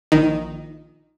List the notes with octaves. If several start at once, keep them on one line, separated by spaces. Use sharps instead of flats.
A#1 D#3 D#4